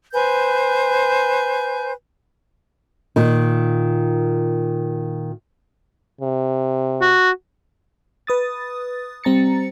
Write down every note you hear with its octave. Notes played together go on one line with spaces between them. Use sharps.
B4 C5 G#5 G6
A#2 D#3
C3
F#4
B4 D#6 A6
G3 C4 A#5 A6 C#7